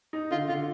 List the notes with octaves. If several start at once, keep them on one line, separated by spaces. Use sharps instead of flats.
D#4
D3 F4
D3 F4